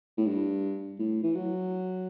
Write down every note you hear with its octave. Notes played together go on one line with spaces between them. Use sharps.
A2
G2
A2
E3
F#3